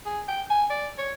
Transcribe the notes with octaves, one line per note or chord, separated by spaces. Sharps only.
G#4
G5
G#5
D5
C#5